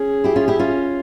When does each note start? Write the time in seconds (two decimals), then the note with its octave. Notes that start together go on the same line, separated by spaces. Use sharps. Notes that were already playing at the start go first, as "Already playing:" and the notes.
Already playing: C#4 G#4
0.24 E4 G4
0.36 C#4 F4
0.48 E4 G4
0.59 C#4 F4